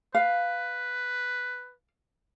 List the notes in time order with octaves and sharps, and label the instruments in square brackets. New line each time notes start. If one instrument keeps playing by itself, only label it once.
[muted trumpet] B4 [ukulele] F5